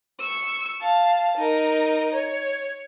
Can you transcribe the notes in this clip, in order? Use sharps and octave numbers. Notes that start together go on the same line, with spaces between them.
C#6 E6
F5 A5
D#4 A#4
C#5